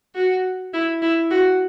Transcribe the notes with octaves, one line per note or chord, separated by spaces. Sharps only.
F#4
E4
E4
F#4